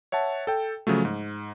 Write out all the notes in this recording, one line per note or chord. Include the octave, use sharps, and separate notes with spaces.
C#5 E5 F#5 A5
A4 G5
C#3 F3 F#3 A3
G#2